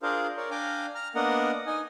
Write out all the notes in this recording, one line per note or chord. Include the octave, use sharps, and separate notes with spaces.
D4 F4 G#4 A#4 C5 F5
A#4 C#5 D5
D4 F5 G5 G#5 A#5 D6
A#5 F6
A#3 B3 D4 A#4 D#5 F#5
D#4 D#5 G#5